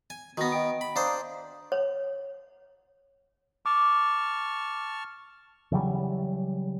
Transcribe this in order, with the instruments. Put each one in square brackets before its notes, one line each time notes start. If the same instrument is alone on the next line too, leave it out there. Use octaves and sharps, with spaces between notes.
[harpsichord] G#5
[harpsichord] D#3 B3 [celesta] F#4 A#6
[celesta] D#5 G5 D7
[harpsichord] B5
[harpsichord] D4 C5 [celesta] F5 A#5 D#6
[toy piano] C#5
[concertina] A5 C#6 F6 [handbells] D6
[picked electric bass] C#3 E3 F#3 G3